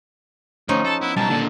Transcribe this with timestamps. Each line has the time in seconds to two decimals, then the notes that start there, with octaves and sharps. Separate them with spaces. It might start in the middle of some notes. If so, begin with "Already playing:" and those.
0.69 D2 F3 C#4 D#4
0.85 A4 A5 A#5
1.01 B3 E4 B4
1.16 B1 G3 A#4 A5 A#5
1.30 D#2 A#2 D4 A4